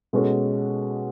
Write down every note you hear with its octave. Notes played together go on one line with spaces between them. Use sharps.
B2 G#3 C#4 F#4 A4